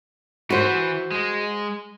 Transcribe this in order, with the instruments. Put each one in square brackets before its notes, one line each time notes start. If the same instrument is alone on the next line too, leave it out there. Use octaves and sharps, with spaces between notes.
[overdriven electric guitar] E3 B4 [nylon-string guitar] F#4 C5
[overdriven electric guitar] G#3